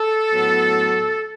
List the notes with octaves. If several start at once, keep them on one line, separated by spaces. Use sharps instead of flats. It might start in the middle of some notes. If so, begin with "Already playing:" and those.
Already playing: A4
A2 F#3 B3